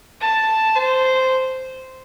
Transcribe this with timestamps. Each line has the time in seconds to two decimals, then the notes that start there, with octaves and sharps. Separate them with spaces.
0.21 A5
0.76 C5